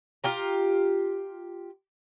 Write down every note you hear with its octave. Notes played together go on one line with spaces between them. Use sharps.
F4 G4 A#5